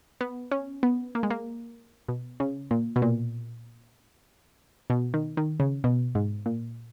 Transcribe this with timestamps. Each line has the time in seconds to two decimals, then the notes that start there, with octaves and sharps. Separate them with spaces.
0.21 B3
0.52 C#4
0.83 B3
1.15 A#3
1.23 G#3
1.30 A#3
2.08 B2
2.40 C#3
2.71 A#2
2.96 B2
3.02 A#2
4.90 B2
5.14 D#3
5.37 D#3
5.60 C#3
5.84 B2
6.15 G#2
6.46 A#2